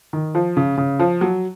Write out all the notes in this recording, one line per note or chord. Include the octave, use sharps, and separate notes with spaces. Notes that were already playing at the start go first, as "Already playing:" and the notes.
D#3
F3
C#3
C#3
F3
F#3